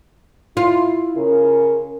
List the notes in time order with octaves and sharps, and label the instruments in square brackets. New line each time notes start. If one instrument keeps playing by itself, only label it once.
[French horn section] E4 [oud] F4
[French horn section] C#3 A#4